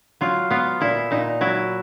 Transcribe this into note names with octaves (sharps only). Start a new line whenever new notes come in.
F#3 F4
B3 F4
A#2 E4
A#2 D#4
F#3 E4